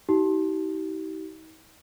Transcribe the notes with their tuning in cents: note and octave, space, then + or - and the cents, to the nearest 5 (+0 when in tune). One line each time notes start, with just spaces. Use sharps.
D#4 +40 G4 -40